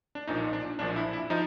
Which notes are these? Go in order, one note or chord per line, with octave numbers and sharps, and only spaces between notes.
D4
B1 A#2 F3 D#4
D4
B1 A#2 F3 D4
E4
E4
F3 D#4